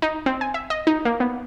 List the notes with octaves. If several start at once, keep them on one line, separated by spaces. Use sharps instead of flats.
D#4
C4
G#5
E5
D#5
D#4
A#3
B3